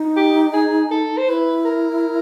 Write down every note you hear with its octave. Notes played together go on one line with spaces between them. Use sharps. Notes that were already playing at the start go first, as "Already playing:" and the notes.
Already playing: D#4
G4
G#4
A4
C5
E4 B4
A#4